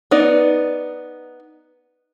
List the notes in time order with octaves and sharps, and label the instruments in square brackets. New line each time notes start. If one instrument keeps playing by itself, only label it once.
[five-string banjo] B3 D#4 D5